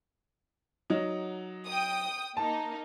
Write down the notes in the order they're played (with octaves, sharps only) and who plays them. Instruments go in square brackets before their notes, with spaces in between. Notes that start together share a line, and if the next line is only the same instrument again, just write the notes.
[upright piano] F#3 D#4
[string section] G5 D#6
[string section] A#3 D#4 [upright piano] A5